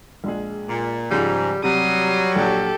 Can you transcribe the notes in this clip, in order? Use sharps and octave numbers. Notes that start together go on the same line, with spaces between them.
A#1 G#3 G#4
A#2
G#2 C#3 F3 G3
C3 F#3 G3 D#6 C7
A#1 G4 A4